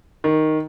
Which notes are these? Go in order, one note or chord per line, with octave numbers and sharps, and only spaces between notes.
D#3